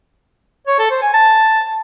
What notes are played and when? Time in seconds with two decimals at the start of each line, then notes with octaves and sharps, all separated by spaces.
0.68 C#5
0.79 A4
0.91 C5
1.02 G#5
1.14 A5